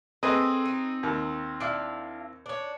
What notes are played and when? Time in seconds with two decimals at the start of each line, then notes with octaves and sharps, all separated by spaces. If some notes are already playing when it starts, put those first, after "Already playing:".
0.23 C4 G#4 A4 B4 D#5
0.65 D#4
1.03 D#2
1.60 D4 E4 F5
2.46 D4 C#5